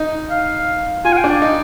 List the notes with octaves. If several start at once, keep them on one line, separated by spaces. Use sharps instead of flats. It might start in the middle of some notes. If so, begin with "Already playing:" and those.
Already playing: D#4
F5
F4 G#5
F5
G5
D4
D5
D#4